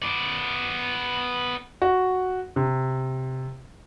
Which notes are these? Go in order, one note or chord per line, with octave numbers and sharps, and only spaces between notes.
B3 D5
F#4
C3